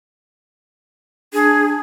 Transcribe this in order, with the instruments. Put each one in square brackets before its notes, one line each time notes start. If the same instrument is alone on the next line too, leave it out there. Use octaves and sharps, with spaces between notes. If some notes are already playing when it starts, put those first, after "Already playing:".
[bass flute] D4 [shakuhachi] G#4